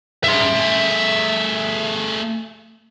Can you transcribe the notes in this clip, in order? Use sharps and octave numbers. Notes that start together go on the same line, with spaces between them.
G2 G#3 E5 C6
A3 G#4